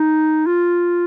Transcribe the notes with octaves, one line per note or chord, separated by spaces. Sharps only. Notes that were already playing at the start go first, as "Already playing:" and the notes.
Already playing: D#4
F4